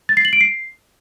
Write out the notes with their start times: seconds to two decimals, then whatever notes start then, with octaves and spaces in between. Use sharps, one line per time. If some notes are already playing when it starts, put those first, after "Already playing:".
0.09 A6
0.17 C7
0.25 F#7
0.33 D7
0.41 C7